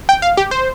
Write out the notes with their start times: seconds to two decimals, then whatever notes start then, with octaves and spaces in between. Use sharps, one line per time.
0.09 G5
0.22 F5
0.37 G4
0.51 C5